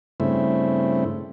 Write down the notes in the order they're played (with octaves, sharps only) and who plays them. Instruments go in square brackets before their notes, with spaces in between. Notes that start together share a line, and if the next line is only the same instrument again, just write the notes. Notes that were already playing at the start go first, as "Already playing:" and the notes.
[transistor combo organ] G2 C#3 A3 C4 E4